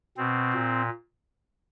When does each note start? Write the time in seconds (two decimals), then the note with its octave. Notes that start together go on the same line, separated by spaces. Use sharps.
0.17 B2 C4
0.53 A#2